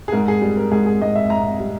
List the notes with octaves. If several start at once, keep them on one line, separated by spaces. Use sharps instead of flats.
G#4
G#2 A#4
G#4
G3
A#4
G#2 G#4
G#4
G#2 D#5
E5
G#2 A#5
G3